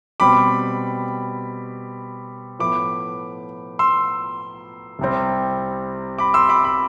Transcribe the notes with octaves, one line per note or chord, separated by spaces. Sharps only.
B2 G3 C4 B5 D6
A2 F3 B3 B5 D6
C6 E6
C2 C3 G3 C4
B5 D6
C6 E6
B5 D6
B5 D6